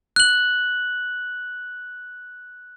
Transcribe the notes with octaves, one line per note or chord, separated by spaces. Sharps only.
F#6 F#7